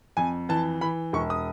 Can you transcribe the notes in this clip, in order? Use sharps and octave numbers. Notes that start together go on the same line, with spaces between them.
F2 G#5
E3 A5
E3 B5
E1 C#6
D#6